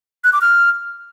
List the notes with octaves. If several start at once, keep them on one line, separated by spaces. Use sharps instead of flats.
F#6
D6
F6